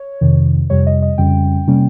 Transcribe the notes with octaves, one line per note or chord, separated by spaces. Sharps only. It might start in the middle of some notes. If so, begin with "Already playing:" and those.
Already playing: C#5
F2 C3 D#3
F2 C3 G3 C#5
D#5
D#5
F2 C#3 G3 C#4 G5
C3 G3 A#3 C#4